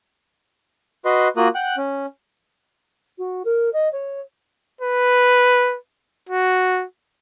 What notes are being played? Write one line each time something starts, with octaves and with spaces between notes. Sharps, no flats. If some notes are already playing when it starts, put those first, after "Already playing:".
F#4 B4 D#5 C6
A#3 F4 F#4 A#4 D#6 F#6
F#5 G5 F#6
C#4
F#4
A#4
D#5
C#5
B4
F#4